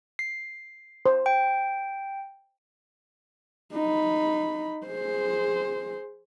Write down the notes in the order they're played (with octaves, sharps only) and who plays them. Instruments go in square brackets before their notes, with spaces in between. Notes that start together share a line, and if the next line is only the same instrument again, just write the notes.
[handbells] C7
[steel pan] C5
[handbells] G5
[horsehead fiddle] D#4 B5
G#4 C5